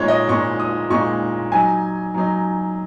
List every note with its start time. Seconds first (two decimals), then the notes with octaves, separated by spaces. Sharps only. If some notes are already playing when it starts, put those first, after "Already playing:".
Already playing: A#2 G#3 D#4 C#5
0.08 D#5
0.28 A#2 G#3 D#4 C#6
0.60 D#6
0.90 A#2 G#3 D#4 C#6
1.52 F#3 D#4 G#5
2.14 F#3 D#4